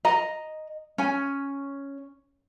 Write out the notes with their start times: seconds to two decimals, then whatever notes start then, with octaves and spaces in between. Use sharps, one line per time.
0.05 D#5 A#5
0.98 C#4 G#5